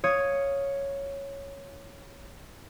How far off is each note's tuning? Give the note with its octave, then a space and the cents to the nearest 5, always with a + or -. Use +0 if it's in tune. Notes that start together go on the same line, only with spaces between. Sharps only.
C#5 +0 F5 +0 D#6 +0